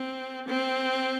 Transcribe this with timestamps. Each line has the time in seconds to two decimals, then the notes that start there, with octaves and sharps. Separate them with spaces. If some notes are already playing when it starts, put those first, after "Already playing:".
Already playing: C4
0.47 C4